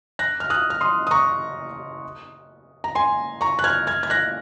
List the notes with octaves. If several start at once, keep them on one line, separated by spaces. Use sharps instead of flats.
F#6 A#6
F6
D#6 F#6
F6
C6 D#6
D#6
A#5 C#6
A#5
G#5 C6
A#5 C#6
F#6
F6 G#6
F6 G#6
G#6
F#6 A#6